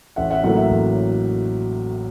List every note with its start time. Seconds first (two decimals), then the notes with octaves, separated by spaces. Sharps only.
0.16 A1 E5 F#5
0.31 E5 F#5
0.43 A2 F#3 A#3 E5 F#5
0.56 E5 F#5
0.69 A1